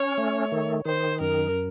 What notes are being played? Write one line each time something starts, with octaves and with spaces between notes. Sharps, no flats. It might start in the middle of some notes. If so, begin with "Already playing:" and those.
Already playing: C#4 C#5
A3
D#3
D#3 C5
F#2 A#4